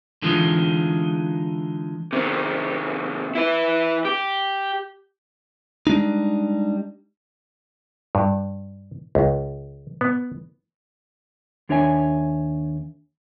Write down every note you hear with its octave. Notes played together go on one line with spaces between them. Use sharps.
D3 E3 G#3 D#4 F4
C3 D#3
E4 B4
G4
G3 G#3 D4 D#4
G2
C#2
B3
D#2 D4 C#5 E5 G#5